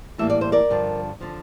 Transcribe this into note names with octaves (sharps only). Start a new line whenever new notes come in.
A2 E3 G3 A#3 E5
D5
C5
A#4 D5
G2 D3 F3
D3 F3